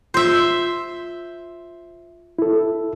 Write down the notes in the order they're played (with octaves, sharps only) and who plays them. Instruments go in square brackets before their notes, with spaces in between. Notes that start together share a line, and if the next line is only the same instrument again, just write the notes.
[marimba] F4 [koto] C5 E5
[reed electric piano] E4 A4